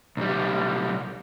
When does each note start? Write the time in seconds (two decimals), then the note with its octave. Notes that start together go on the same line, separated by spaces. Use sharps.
0.17 B1 G3